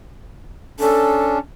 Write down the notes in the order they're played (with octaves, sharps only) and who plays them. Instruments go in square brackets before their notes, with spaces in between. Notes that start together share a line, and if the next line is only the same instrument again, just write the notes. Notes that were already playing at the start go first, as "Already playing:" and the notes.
[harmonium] C#4 D4 [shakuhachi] A4